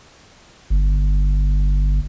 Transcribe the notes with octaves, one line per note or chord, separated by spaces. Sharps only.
G1